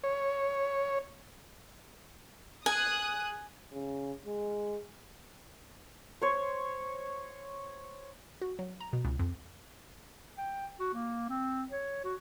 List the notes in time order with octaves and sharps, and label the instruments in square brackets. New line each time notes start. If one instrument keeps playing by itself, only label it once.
[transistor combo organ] C#5
[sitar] G#4 [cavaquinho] G#5 [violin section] D#6 F#6
[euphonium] C#3
G#3
[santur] C5 C#5
[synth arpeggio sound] F#4
F#3
A#5
B2
C#2
F2
[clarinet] G5
F#4
A#3
C4
C#5
F#4